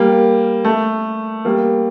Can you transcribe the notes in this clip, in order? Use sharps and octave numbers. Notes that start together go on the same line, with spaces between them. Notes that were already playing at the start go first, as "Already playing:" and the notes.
Already playing: G3 A#3
A3
G3 A#3